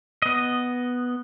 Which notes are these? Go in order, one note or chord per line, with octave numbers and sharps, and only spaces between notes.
B3 D#5